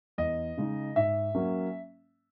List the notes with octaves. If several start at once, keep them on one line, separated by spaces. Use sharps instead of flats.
E2 D#5
C#3 G#3 D#4
G#2 E5
F#3 A#3 C#4